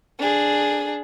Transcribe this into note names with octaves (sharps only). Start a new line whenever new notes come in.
D4 G#4